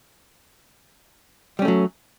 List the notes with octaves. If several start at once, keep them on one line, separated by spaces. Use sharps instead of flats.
F#3 G3 A3 C#4